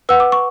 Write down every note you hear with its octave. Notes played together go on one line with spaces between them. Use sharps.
B4 F#5 E6
D6
C#6